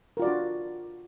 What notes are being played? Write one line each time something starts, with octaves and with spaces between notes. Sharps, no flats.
D4 F4 F#4 A#4 D5